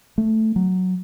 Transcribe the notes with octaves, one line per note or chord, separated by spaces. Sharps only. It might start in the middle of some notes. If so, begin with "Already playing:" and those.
A3
F#3